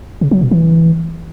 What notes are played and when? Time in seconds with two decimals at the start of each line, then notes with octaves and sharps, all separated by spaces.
0.21 C#3
0.31 F#3
0.41 B2
0.51 E3